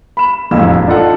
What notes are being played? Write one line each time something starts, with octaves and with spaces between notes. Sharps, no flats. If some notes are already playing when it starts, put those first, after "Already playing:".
B5 E7
E1 F2 A2 F5 E6
D4 D#4 F4 A4 F#5